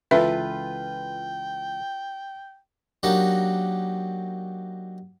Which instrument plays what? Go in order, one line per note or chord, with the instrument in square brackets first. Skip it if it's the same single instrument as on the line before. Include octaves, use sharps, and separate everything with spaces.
[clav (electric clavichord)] C#2 E3 A4 [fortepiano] F4 B4 [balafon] E5 [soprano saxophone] G5
[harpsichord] F#3 A#3 D4 D#4 F#4 G4